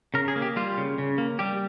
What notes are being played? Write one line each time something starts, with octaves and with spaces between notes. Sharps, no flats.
C#3 A#4
G#4
A#3
G4
G3 F4
C#3
C#3
A#3
G3 G4